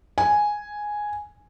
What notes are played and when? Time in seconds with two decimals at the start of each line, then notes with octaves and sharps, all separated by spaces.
0.18 G#5